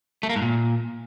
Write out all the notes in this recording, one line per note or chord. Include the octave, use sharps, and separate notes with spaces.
A3
A#3
G#2
A#2